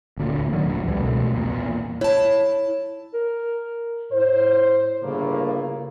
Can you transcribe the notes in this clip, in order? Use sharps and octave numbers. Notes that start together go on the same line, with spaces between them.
D1 D2 A#2
A2 D3 D#3 F#3
D#1 A#1
C#2 E3 G3
E1 B1 B2 A3
E2 A#2
E4 C#5 A5
A#4
A2 C5
G1 A2 C#3 A#3